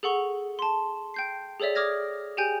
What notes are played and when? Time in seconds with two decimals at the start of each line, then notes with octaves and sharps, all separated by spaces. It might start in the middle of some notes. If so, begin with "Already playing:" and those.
0.03 G#4 A4 F#5 C#6 G7
0.59 A5 C6
1.14 G5 G6 C7
1.60 G#4 A4 C#5 D5 E5
1.75 D6 D#6 F6 G#6 A#6
2.37 G4 G#4 G5 G#5 G6